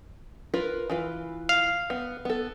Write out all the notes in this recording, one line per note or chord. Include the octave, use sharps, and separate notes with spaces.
F4 A#4 B4
E3 F4 B4
F5
B3
B3 A4